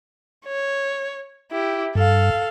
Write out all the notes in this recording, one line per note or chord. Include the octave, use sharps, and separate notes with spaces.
C#5
E4 G4
G2 A4 F5